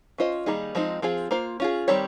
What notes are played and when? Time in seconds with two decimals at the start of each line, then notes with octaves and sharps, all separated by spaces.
0.18 C#4 F4 C5 D#5
0.46 D#3 G3 A#3 D#4 G#4
0.75 F3 G#3 C4 D#4
1.02 F3 C4 F4 G#4
1.31 A#3 F4 C5
1.60 C#4 F4 G#4
1.88 D#3 G3 C4 G4 C#5